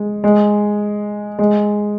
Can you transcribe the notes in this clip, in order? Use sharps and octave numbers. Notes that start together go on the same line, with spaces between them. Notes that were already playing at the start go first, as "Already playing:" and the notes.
Already playing: G#3
G#3
G#3